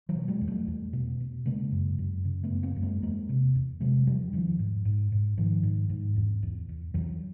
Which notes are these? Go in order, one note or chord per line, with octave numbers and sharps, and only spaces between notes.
E3 F#3
B2
F#3 G#3
E2
G3 A3
E2
B2
B2
C#3 G#3 A#3
F#2
F#2
C#3
A3 B3
F#2
A#3 C4
F#2
G#3 A#3
E2 G#3 A#3
C3
E2
C3 F#3 G#3
E2 F3 G3
E2 D#3 F3
G#2
G#2
G#2
G#2 D#3 F3
G#2
G#2
E2
E2
E2
E2 E3 F#3